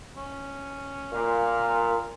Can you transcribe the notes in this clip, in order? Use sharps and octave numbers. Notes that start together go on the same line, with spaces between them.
C#4
A#2 F5